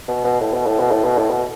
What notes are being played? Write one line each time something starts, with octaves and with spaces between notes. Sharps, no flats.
B2
B2
A2
B2
A2
B2
A2
B2
A2
B2